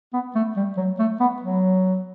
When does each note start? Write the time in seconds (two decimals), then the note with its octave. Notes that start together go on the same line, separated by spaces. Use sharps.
0.13 B3
0.35 A3
0.57 G3
0.77 F#3
0.99 A3
1.20 B3
1.42 F#3